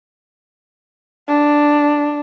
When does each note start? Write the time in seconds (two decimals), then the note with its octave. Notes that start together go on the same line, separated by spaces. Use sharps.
1.29 D4